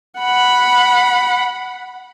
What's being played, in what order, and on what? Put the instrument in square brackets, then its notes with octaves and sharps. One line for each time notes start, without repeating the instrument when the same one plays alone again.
[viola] F#5 B5